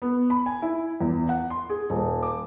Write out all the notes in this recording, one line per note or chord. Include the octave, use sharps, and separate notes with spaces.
B3
B5
G#5
E4
E2
F#5
C6
G#4
D#1
D6